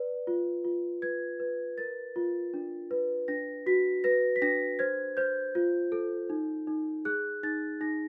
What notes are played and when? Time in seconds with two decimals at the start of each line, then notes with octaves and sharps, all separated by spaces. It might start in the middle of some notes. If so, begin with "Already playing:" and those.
Already playing: B4 D5
0.27 F4
0.64 F4
1.02 B4 G#6
1.40 B4
1.78 A#4 A6
2.16 F4
2.54 D4
2.91 B4
3.28 D4 A#6
3.66 F#4 B6
4.04 B4 A#6
4.36 B6
4.42 D4 A#6
4.79 C5 G#6
5.17 C5 G6
5.55 F4
5.92 A4
6.30 D#4
6.67 D#4
7.05 G#4 F#6
7.43 D#4 A6
7.81 D#4 A#6